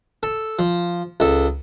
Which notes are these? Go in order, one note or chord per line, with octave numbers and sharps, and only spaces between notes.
A4
F3
C#2 A4